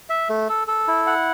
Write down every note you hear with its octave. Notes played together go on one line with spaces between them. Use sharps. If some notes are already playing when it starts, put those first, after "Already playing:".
E5
A3
A4
A4
E4
F#5